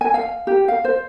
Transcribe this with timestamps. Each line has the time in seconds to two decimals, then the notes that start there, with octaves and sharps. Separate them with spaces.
0.01 G#5
0.14 F5
0.47 G4
0.68 F5
0.85 C5